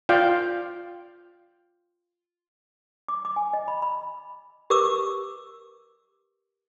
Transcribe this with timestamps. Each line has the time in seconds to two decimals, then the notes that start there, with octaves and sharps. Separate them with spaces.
0.09 F4 D5 F5 G5
3.08 D6
3.25 D6
3.36 G#5
3.53 D#5
3.68 B5
3.82 B5
4.70 G4 A#4 B4 C#6 D6 E6